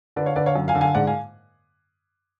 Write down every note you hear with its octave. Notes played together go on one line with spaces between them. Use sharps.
D3 B4 D5
C#5 F5
D3 B4 D5
C#5 F5
F#2
F5 G#5
D3
F5 G#5
G#2 D5 F#5
F5 G#5